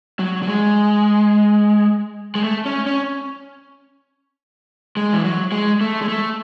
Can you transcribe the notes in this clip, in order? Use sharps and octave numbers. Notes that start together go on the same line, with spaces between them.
F#3
F#3
G#3
G#3
A3
C#4
C#4
G#3
E3
F#3
G#3
A3
G#3
A3